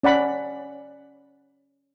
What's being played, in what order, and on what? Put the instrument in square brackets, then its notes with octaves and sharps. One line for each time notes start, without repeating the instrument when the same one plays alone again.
[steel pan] C#4 D5 F#5 B5